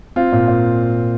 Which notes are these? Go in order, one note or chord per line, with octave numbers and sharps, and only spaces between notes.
C4 F4
A#2
A#2